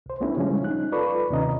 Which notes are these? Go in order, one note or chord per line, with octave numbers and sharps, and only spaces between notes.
C2 C5
A3 B3 C#4 D4 E4 G4
C#3 F3 G3 G#3 C#4
D#4 F#6
F4 A4 B4 D5 B5 C#6
D#2 C3 C#4 D#5 A#5